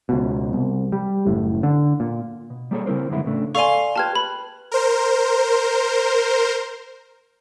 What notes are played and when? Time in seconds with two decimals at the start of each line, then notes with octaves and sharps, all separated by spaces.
0.09 C#2 B2
0.53 C2
0.92 G3
1.27 F#1 A2
1.63 D3
2.00 A#2
2.50 B2
2.71 G3 A#3 E4 G#4 A4 C#5
2.86 C#3 C4 E4 A#4 C5
3.10 F#2 D3 D#3 G#3 B3 E4
3.24 A2 C#3 A3 D4
3.55 A4 D5 F5 G#5 C6 C#6 D#7
3.96 F4 G4 B4 A5 F6 G#6
4.15 B4 B5
4.71 A#4 C5